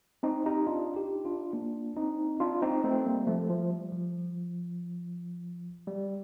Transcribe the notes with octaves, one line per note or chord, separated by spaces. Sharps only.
C4 D#4
D#4 G4
D4 F4
D#4 G4
D4 F4
A#3 D4
C4 D#4
D4 F4
C4 D#4
A3 C4
G3 A#3
F3 A3
F3
G3
F3
G3